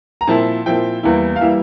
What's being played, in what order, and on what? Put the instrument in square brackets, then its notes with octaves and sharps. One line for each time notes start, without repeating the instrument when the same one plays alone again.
[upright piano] A#5
A#2 F3 C4 E4 A5
A#2 F3 C4 E4 G5
E2 E3 G3 A#3 E4
F5
E3 G3 A#3 E4 E5